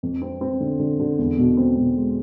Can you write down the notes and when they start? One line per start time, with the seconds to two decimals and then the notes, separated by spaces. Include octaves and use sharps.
0.03 F2
0.22 C4
0.41 C4
0.60 D3
0.79 D3
0.99 D3
1.18 E2
1.38 B2
1.57 C4
1.77 B2
1.96 G#3